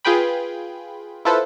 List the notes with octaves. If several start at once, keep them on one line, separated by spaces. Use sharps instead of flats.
F4 G#4 B4 G5 B5
E4 F4 A4 B4 C5